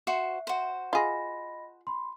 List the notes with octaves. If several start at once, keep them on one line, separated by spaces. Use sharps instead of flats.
F#4 C5 E5 C#6
F#4 C5
F4 G#4 D#5 B5 A#6
B5 C6